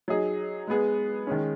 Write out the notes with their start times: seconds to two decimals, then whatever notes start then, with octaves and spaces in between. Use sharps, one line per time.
0.08 F#3 D#4 G#4
0.67 G#3 B3 G#4
1.27 D#3 G#3 C#4